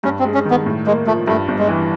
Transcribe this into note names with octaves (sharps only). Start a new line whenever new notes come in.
G2 C#4
C4
G#3
C#4
D#3
B3
A2
G#3 A#3
F3 A3
G2 A3
G1
G#3
E3